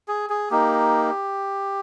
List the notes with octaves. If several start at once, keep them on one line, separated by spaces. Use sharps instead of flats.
G#4
G#4
A#3 D#4 G4